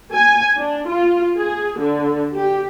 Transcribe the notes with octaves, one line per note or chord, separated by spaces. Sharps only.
G#5
D4
F4
G#4
D3
G4